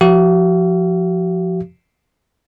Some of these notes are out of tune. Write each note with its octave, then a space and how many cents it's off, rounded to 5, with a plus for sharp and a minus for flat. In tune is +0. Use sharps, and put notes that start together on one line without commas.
F3 +0 F#4 +45 F5 -40